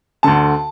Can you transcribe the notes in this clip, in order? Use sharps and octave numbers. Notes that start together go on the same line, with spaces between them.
D2 D3 A5